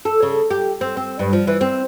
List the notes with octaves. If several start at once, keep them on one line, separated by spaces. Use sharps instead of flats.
A4
C#3
G4
C4
C4
G2
F3
E3
C4